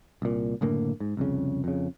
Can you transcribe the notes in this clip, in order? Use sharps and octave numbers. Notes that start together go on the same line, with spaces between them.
C2 A#2
F#1 A2 D3 A#3
G#2
C2 F2 C#3
F2 C#3